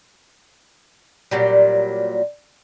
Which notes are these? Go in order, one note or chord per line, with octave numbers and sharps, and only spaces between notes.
A#2 F#3 G3